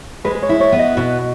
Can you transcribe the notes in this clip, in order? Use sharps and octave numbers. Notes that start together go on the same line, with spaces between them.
G#3 B4
B4
C#5
E4
C#5
B3
D#5
B2